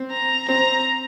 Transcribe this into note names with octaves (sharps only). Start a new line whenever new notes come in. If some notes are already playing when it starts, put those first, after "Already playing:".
Already playing: C4
A#5
C4 A#5